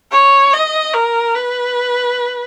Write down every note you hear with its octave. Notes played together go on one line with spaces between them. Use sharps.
C#5
D#5
A#4
B4